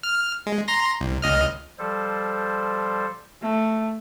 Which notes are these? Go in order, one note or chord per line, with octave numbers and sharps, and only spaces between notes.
F6
G#3
A#5 C6 A#6
C2
C#2 D#5 F6
F3 G3 A4 C5
A3